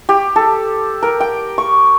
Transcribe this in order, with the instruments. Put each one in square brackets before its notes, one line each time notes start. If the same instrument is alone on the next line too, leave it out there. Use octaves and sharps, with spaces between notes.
[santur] G4
A4
A#4
G5
C#6